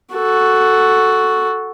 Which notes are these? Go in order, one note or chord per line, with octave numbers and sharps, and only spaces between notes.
F#4 A4